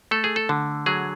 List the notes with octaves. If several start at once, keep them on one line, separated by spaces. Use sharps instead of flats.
A3 A4
G#4
A4
D3
F#3 G#4